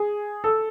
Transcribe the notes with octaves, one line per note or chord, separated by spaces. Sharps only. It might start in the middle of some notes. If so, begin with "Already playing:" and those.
Already playing: G#4
A4